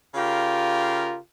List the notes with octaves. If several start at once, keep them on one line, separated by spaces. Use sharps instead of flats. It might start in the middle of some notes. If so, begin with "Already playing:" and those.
C#3 F4 G4 A#4